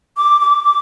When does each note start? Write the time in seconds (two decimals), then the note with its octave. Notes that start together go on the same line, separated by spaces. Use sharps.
0.17 D6
0.41 D6
0.65 D6